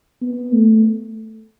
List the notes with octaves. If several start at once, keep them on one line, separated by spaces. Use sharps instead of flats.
B3
A3